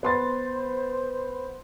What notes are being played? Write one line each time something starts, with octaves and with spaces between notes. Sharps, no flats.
B3 C5 C6 A6